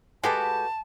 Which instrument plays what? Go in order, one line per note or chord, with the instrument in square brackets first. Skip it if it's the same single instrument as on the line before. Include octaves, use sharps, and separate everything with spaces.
[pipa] G#3 G4 [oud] F#4 A4 B4 [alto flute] A5